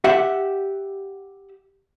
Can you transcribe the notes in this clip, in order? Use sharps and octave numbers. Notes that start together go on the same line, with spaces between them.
G4 E5 F#5